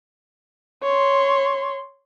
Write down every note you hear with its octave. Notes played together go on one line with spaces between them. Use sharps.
C#5 C6